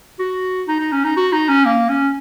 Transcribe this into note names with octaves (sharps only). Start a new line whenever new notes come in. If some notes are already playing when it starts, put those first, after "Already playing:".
F#4
D#4
D#4
C#4
D#4
F#4
D#4
C#4
A#3
C#4